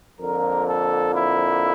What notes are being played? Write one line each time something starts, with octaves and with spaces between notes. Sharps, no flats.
F2 D3 F3 A#3 A#4
A4
E4